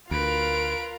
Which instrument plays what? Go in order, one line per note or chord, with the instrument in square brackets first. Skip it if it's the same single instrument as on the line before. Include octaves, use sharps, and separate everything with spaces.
[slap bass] D2 [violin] F4 A#4 [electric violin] B4 D7